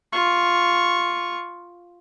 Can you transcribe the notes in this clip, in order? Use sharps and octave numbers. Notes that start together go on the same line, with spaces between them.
F4 C#6